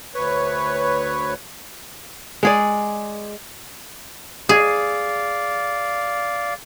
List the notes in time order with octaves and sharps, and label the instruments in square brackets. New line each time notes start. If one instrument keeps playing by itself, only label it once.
[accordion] D2 B4 C#5
[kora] G#3 G#4 D5
[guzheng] G#4 [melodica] D5 F5